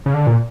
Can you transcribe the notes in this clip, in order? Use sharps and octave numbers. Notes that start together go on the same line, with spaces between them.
C#3
D3
A#2